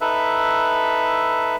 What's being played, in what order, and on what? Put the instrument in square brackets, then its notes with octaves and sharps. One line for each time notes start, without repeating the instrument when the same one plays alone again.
[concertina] D#4 A4 B4 E5